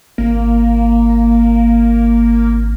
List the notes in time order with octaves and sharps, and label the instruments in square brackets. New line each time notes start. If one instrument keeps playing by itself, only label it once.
[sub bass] G#1 [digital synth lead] A#3